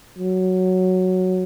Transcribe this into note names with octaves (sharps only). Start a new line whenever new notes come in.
F#3